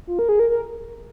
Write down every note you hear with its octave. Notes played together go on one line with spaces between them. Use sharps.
F4
A#4
G#4
A#4
A#4